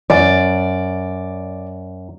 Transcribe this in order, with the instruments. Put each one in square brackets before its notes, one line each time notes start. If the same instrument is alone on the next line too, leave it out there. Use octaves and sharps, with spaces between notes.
[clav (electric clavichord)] F#2 [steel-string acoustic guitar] D5